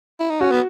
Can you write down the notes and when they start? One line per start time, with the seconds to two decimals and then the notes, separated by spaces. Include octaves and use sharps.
0.20 E4
0.30 D#4
0.41 C#4 F#4
0.51 B3